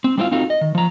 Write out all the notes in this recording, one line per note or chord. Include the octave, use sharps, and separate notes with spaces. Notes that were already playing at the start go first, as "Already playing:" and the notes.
C4
G3 A#3 C4 E4 F4 F5
C4 D#4 F4 F#4 A4
D#5
D#3
F3 A#5